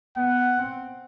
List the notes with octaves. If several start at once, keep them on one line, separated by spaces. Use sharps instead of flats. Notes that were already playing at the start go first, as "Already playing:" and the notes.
B3 F#5
C4